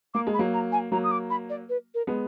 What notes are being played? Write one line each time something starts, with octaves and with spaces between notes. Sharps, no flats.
A#3 D6
G#3
B5
F#3 A#3
A#5
G#5
F#3 A#3 A#5
D#6
D6
B5
D5
B4
A#4
G#3 B3